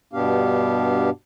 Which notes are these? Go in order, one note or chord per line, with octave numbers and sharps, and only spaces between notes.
G2 B2 B3 D4 G4 F5